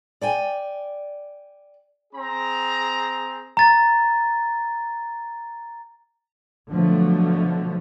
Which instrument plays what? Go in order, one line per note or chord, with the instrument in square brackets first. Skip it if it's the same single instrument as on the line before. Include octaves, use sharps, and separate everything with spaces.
[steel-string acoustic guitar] D5 G5 G#5
[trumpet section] C4 G#4 A#5
[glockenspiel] A#5 A6
[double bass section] B2 D3 F3 F#3 A3